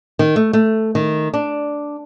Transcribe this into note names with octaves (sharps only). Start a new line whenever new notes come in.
D#3
A3
A3
D#3
D4